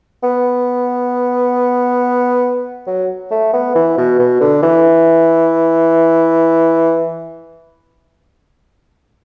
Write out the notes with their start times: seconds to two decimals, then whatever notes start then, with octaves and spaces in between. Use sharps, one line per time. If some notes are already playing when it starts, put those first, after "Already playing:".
0.23 B3
2.87 F#3
3.31 A3
3.53 B3
3.75 E3
3.97 B2
4.19 B2
4.41 D3
4.63 E3